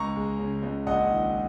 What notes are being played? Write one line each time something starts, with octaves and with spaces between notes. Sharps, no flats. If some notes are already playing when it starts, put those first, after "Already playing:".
Already playing: C#2 A#5 C#6
G#3
C#3
C#2
A#1 D#5 F#5
D#3